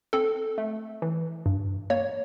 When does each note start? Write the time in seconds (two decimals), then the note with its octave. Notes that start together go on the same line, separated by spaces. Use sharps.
0.13 C4 A4
0.58 A3
1.02 E3
1.46 G2
1.90 A#3 C#5